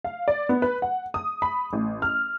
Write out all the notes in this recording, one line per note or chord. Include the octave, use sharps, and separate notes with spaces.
F5
D5
B3
B4
F#5
D#6
B5
A1
F6